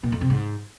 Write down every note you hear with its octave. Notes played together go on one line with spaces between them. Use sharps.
A#2
F2
C3
G#2